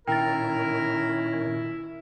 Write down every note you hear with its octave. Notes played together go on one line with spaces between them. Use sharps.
A#2 D#3 C#4 E4 A#4 G5 A6